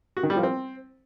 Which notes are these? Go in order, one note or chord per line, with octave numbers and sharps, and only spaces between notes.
F#4
D#3
G3
F3
C4